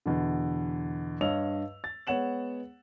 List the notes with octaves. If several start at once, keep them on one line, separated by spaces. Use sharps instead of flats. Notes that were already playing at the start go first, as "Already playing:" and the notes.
E2 B2 D3
G2 C#5 D#5 F5 E6 F7
A6
G#3 B3 C#5 F#5 E7 F#7